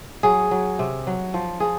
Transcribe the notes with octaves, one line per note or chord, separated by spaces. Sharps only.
F#3 G#4
F#3
C3
F#3
F3
F3 G#4